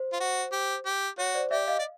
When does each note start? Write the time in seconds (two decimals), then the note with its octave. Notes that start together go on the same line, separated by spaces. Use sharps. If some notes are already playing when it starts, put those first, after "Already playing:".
Already playing: C5
0.13 F4
0.20 F#4
0.52 G4
0.86 G4
1.18 F#4 C#5
1.34 C5 D5
1.51 G4 D5 E5
1.67 D#5 F5
1.79 D5